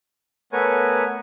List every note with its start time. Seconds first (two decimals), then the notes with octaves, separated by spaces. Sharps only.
0.53 A3 B3 A#4 B4 C#5 G#5